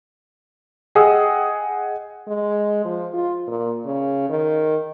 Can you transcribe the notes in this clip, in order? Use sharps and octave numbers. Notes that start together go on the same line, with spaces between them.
G#4 D#5 F#5 G5 D#6 E6
G#3
F3
F4
A#2
C#3
D#3